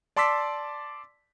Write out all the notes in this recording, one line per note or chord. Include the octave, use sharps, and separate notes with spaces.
D5 A5 C6 D6 E6 B6